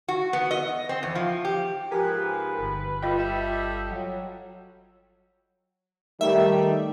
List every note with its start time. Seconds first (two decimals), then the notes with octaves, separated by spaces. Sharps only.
0.08 F#4
0.33 B3
0.51 D#5
0.89 C4
1.03 E2
1.15 F3
1.45 G4
1.91 G#2 F3 G4 A#4 B4 G#5
2.59 G1
3.03 G3 F4 A4 D#5 G5
3.19 E5
3.91 F#3
6.21 D#3 G3 A3 E5